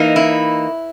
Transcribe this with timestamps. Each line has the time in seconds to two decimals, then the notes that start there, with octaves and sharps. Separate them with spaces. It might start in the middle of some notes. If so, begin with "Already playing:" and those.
Already playing: E3 A#3 D#4
0.16 E4